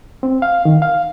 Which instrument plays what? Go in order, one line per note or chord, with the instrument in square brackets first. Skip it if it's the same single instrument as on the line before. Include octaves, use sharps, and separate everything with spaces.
[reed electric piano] C4
F5
D#3
F5